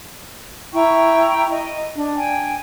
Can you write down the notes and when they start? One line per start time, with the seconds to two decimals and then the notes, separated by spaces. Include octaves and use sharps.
0.74 E4 G5 A#5 C#6
1.50 D#5
1.95 D4
2.16 G5 G#5